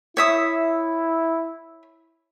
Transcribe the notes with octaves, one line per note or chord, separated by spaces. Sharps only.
E4 C#5 E5 D#6